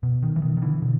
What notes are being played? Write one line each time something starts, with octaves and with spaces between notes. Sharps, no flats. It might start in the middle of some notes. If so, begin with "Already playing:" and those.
B2
D#3
E3
B2 D#3
D#3
D3 E3
B2